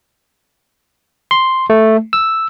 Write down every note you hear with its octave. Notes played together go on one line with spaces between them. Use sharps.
C6
A3
E6